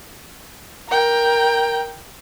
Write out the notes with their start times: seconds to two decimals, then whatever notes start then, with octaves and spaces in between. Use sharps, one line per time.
0.89 A#4 G5